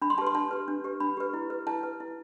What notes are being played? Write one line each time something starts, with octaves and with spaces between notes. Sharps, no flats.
D4 B5
C6
G4 B4 A5
C6
D4 A5
G4 B4
D4
G4 B4
D4 B5
G4 B4
E4
B4
E4 A5
B4
E4